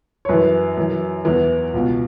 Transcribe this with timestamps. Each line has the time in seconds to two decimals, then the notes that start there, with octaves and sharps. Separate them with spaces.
0.25 C#5
0.29 F#2 E3 B4
0.77 F#2 E3
1.25 E2 E3 B4
1.74 C#2 B2